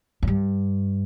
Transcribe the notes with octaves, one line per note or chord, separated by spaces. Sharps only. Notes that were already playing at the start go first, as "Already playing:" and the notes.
F#2
G2